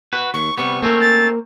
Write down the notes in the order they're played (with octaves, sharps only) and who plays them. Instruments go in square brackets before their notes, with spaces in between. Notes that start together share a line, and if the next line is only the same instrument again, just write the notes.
[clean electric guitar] F#4 B4
[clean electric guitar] D#2 [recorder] C#6
[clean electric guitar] C3 G3 B3 [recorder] C#6
[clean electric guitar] A3 C4 C#4 [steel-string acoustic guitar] A#3 A#4
[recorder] A6